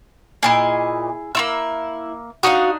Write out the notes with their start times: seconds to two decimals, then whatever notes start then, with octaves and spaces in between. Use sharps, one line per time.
0.43 A#2 E4 F#4 G#4 D#5
1.35 A#3 E4 F4 E6
2.43 D4 D#4 F#4 F5 D#6